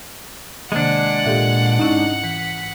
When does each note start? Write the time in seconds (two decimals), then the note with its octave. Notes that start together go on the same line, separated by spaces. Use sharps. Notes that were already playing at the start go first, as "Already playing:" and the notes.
0.72 C3 D#3 G#3 A#3 D4 F#5
1.25 A#2 G4 A4 E5
1.79 G#2 C#4 D#4 E4
2.24 E3 B6